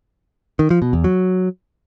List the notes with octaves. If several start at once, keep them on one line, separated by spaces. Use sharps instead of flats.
D#3
F3
B2
E2
F#3